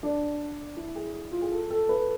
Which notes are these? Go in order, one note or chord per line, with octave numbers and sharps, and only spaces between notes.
D4
E4
G#4
F4
G#4
A4
A4
B4